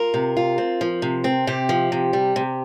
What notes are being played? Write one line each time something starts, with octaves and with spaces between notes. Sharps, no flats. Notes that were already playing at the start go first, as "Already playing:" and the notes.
Already playing: F4 A#4
C3
F4
C4
F3
C3
C4
C3 G4
F3
C3
G3
C3